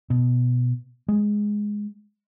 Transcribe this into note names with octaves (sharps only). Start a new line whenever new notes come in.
B2
G#3